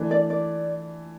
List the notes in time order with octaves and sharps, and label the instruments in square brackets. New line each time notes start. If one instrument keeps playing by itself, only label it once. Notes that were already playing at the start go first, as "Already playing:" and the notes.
Already playing: [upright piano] E3 A3 D4
[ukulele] D5
D5